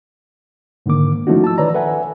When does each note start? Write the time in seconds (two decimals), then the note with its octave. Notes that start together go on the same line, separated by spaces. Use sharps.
0.86 G#2 D3 D#3 A#3 D6
1.27 F3 A3 C#4 D#4 E4 F#4
1.44 A5 E6
1.58 D#3 B4 C#5 D5 A#5
1.74 A4 B4 E5 F#5 G#5